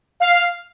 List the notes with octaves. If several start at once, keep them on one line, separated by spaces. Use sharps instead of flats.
F5